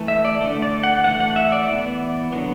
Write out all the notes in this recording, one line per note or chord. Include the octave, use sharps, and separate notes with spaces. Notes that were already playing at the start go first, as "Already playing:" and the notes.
Already playing: E3 A3
E5
D5
D3 A3
D5
F#5
E3 A3 F#5
F#5
E5
D5
E3 B3
D3 F#3 B3